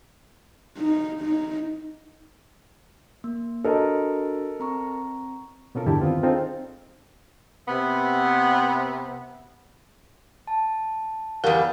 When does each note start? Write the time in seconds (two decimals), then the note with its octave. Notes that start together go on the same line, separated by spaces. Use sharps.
0.78 D#4
1.21 D#4
3.24 A#3
3.64 D4 F#4 A4 A#4 D#5
4.60 C4 A#5 C#6
5.75 B2 B3 C#4 F4 A4 A#4
5.87 E2 G2 D3 E4 G4 A5
6.01 D#3 B3 C4 F4
6.23 C4 D4 D#4 F4 G#4 A4
7.67 C3 B3
10.47 A5
11.44 E2 G3 A#4 F5 F#5